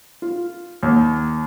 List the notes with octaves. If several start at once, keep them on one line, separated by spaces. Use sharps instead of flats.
F4
D#2